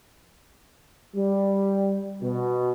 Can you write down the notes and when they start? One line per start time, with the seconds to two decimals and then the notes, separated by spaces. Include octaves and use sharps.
1.15 G3
2.22 B2